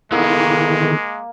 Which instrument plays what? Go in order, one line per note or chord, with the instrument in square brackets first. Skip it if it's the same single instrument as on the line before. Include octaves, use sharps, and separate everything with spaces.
[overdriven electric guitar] D#3 E3 [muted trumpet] G#3 [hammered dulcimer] A#3 [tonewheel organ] B3 G#4 A4